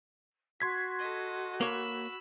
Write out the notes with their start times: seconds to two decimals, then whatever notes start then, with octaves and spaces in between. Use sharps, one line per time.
0.60 F#4 C6 G#6 B6
0.99 A4 D#5
1.61 A#3 C#5 B5 E6